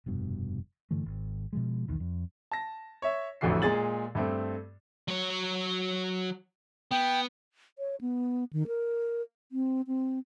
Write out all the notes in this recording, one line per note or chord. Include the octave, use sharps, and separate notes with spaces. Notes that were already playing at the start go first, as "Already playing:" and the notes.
F1 G2 B2
G2 D3 E3 A3
G#1
B2 F3 G#3
B1 E2 D#3
F2
A5 A#6
C#5 E5
A1 F2 D3 E3 F#4 C7
A#2 G#3 G#4 A6 F#7
G2 A3 C4
F#3 C#5
B3 G5
C#5
B3
D#3
A#4
C4
C4